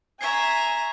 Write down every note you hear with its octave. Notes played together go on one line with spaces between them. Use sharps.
E5 G#5 A#5 C#6 G#6 C7